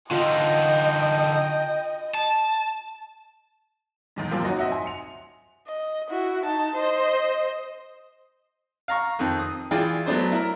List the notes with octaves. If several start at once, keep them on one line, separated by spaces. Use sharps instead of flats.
D3 D#4 F4 D#5 F5 G5
A5
B1 E2 G#2
F#2 C3 F3 A#3 C4
C#4 D#4 F#4 D#5
C4 F#4 D#5 E5 F#5
G#5 C6
C#7 F7
D#5
E4 F#4
D#4 A5
C5 D#5
F5 A#5 C#6
F2 D#3 C4
D#6
E3 F4 G#4 D5 G5
F#3 A3 B3 D4 C5
E4 A#4